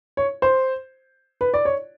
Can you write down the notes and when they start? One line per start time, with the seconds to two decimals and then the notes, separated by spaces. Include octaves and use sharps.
0.17 C#5
0.42 C5
1.41 B4
1.54 D5
1.65 C#5